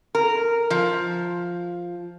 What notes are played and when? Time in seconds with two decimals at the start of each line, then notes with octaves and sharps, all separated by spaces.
0.15 A#4
0.70 F3